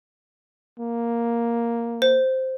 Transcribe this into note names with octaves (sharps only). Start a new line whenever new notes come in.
A#3
C5